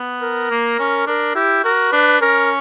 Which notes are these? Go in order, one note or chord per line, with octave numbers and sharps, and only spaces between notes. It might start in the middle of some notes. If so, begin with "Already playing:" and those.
Already playing: B3
A#4
A#3
C#4
D4 A#4
E4 G4
F#4 A#4
D4 B4
C#4 A#4